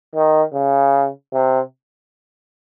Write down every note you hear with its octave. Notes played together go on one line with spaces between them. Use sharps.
D#3
C#3
C3